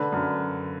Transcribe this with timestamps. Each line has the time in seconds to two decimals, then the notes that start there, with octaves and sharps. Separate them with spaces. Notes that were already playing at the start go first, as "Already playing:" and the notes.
Already playing: D3 B4
0.12 F#2